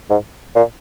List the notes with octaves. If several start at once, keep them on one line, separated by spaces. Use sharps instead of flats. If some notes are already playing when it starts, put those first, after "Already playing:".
G#2
A#2